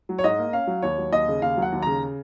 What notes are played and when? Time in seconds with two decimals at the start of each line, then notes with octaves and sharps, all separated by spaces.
0.09 F#3
0.19 C#5
0.24 G#2 D#5
0.39 A#3
0.53 C#4 F5
0.67 F#3
0.82 D#2 C#5
0.98 F#3
1.12 D#2 D#5
1.28 C#3
1.42 D#2 F5
1.57 F#3
1.62 F#5
1.72 D#2
1.83 C#3 A#5